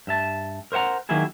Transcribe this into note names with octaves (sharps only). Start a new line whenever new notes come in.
G2 E5 A5
A#4 C5 E5 F#5 A#5
D#3 F#3 A#3 B3 E4 G#4